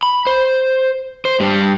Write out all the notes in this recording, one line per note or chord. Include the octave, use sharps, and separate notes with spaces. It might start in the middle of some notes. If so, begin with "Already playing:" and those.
B5
C5
C5
G2 G3